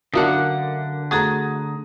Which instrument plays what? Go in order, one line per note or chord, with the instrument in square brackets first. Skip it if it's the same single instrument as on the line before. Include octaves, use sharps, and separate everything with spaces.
[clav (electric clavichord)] F#2 A#3 D4 [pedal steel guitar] D3 F#5 [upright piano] F#4 E5 [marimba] D#6
[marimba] A3 G#4 A4 [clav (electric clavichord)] F#4 [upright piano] A#5 D#6